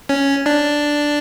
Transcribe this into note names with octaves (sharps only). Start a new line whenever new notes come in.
C#4
D4